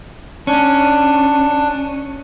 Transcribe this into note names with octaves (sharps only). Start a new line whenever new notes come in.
C#4 D4